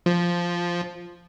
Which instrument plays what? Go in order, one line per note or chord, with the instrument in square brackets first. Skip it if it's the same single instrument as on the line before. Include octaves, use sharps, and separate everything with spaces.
[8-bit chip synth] F3